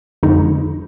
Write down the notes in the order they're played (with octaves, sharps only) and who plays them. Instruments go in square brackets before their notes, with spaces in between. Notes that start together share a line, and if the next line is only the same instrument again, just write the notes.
[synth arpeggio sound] F2 D3 F3 G#3 D#4